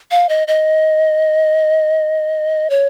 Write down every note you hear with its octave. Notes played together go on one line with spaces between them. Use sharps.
F5
D#5
D#5
C#5